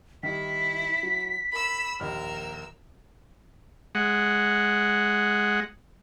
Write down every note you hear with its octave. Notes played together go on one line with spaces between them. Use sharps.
D#3 G3 E4 B6
F#3
A#4 B5 E6
A#1 D#2 A#4 E6 F6
G#3 F#5